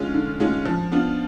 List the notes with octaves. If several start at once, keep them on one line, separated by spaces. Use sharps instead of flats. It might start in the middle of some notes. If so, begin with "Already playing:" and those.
Already playing: D3 G#3 C#4 F4 G#4
D3
G#3 C#4 F4 G#4
F3
B3 D4 F4